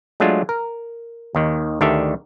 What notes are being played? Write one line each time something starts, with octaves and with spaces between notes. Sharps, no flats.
F#3 G#3 A3 D4 F4
A#4
D#2 D#3
D2 D#3 D4 G4 A4 E5